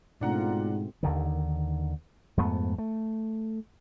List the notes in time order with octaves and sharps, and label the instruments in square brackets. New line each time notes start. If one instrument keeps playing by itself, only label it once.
[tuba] G#2 [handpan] B2 A3 C4 [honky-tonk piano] D4 F#5 A#5 [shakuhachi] F4
[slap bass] D#2 D3 D#3
F2 G#2 A3 B3
A3